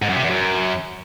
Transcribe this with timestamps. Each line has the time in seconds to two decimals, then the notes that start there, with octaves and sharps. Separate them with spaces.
0.02 G#2
0.09 F#2
0.16 C3
0.23 E2
0.30 F#2